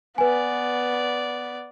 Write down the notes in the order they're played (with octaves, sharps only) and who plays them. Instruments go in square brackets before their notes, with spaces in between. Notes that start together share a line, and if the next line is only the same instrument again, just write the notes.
[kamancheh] B3 D5 [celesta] B4 G#5